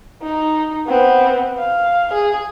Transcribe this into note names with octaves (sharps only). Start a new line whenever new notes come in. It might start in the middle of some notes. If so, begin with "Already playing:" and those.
D#4
B3 C4
F5
G#4